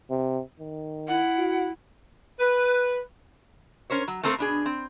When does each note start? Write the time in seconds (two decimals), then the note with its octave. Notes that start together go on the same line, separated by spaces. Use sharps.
0.11 C3
0.60 D#3
1.08 E4 F#5
1.38 F#4
2.40 B4
3.90 C#4 A#4 C5 C#5
4.08 F#3
4.23 A3 A#3 C4 A4 A#4
4.38 B2 D4 G#4
4.66 C4